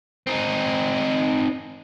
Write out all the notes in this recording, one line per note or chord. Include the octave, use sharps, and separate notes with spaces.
C4 D#4